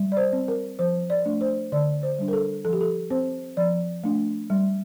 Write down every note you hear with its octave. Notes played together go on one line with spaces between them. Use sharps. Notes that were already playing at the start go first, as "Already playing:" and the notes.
Already playing: G3
D5
C5
C4
A#4
F3 C5
D5
A3 D4
C5
D3 D5
C5
G3 D4
A#4
A4
F3 A4
G4
A4
C4 C5
F3 D5
A3 D4
G3